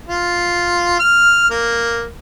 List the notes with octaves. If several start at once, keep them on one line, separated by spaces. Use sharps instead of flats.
F4
F6
A#3